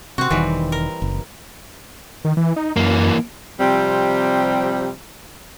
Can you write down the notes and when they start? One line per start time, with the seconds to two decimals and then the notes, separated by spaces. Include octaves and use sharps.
0.18 C3 C4 F#4
0.30 E1 D#3 E3 G3
0.72 A#4
1.02 F#1
2.25 D#3
2.37 E3
2.56 D#4
2.77 F#2 E3 A#3
3.59 C3 F3 G3 C4